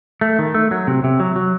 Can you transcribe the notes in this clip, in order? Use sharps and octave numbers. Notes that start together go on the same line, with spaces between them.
A3
D#3
A3
F#3
C3
C3
F#3
F#3